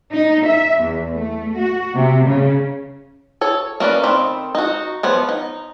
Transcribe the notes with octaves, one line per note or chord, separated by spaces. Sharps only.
D#4
E5
E2
A3
F#4
C3
C#3
A4 C#5
A#3 C#4 B4 D5
D#3 C4 A4 B5
D#4 F#4
F3 B3 C#5
D#4